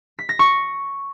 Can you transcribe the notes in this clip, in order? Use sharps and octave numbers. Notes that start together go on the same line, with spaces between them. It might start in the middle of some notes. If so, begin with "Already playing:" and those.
B6
A#6
C#6